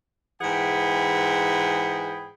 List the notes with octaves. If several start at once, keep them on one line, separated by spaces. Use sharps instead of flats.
G#2 E3 G#4 F#5 G5 B5